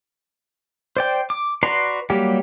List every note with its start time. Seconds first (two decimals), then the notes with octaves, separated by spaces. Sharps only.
0.97 C5 D5 G5
1.30 D6
1.63 F#4 B4 D5 A#5 C6
2.10 F#3 G3 A#3 G4